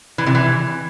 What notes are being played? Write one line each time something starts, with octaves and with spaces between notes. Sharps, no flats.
E3
C3
E3